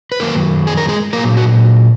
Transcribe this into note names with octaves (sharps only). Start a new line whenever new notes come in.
B4
F#2 D#3 F#3 A#3 A#4
G#4
A#4
G#3 G#4
A#2 F#3 A#3 A#4
F#4